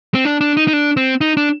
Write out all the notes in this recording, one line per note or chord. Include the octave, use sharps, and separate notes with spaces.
C4
D4
D4
D#4
D#4
D4
C4
D#4
D4